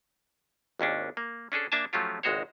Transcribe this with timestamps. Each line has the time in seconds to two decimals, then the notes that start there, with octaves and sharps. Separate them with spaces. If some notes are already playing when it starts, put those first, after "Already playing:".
0.80 G#1 D#2 C#4 D4
1.17 A#3
1.52 C#4 D4 G#4 A4
1.72 A#3 D4 E5 G#5 A5
1.93 F3 F#3 A3 C#4 F4 G4
2.23 G#1 C#2 G#3 F#4 C5 C#5